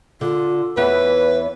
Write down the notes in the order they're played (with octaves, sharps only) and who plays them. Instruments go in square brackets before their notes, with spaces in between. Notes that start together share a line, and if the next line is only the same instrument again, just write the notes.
[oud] D3 [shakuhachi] F4
[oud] E2 E3 B3 [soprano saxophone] B4 [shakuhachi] C#5